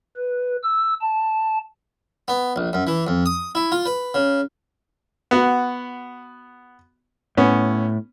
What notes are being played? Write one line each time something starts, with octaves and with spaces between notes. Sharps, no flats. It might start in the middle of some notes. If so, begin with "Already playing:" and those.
B4
E6
A5
B3
A#1
F#2
E3
F2
D#6
E4
F4
B4
C#3
B3 F#4
A2 B3 C#4